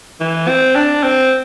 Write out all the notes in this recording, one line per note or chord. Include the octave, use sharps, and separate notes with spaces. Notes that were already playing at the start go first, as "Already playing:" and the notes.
E3
C4
D4
C4